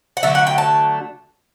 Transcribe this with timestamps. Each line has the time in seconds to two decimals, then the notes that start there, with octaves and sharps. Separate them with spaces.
0.17 F#5
0.23 D3 F#3 A3 E5
0.35 F#5
0.47 G5
0.58 A5